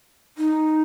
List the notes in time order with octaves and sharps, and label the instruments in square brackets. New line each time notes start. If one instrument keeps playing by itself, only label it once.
[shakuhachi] D#4